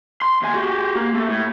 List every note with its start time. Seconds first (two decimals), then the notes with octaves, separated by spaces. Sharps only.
0.22 C6
0.42 D#2 G#5
0.54 F#4 G4
0.95 A#3
1.14 A3
1.29 A2